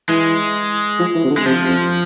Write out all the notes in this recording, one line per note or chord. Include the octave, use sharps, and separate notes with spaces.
E3 G#3
F3
E3
C3
D3
G#3
C3 F3
F2